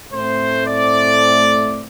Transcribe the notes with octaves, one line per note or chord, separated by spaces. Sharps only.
A2 A3 C4 C5
D5